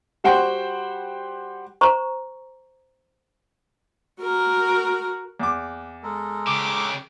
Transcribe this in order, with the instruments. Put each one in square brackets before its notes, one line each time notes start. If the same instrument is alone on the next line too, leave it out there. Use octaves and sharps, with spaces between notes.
[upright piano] G3 F#4 C5 F#5 G5
[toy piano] C5 A#5 C#6
[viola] F#4 A#4
[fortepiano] E2 D6
[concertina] G#3 A4 A#4
[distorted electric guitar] C#3 G4 [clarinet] D6